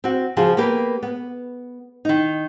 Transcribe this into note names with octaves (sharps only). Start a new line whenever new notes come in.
C4 F#4
C#3 F3 F4 F#4 G#4
A#3 B3 G4 B4
B3
D#3 D#4